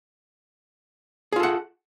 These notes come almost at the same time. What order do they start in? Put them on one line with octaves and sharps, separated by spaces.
G#4 F4 A4 F#5